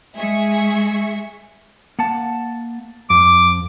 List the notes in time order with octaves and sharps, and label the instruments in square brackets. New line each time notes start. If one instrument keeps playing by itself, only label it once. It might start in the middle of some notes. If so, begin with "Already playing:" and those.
[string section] G#3 G#4 E5 C#6
[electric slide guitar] A#3 F#5 A5
[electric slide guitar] F2 [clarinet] D6